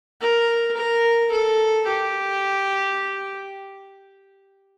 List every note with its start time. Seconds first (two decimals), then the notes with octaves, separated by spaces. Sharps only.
0.21 A#4
0.77 A#4
1.31 A4
1.86 G4